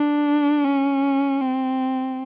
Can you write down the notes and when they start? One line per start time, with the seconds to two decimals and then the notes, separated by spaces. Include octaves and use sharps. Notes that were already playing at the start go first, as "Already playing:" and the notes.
Already playing: D4
0.64 C#4
1.41 C4